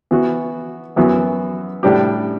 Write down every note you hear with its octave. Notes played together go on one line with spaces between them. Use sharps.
E3 B3 F#4
F#2 E3 B3 F#4
A2 G3 D4 G4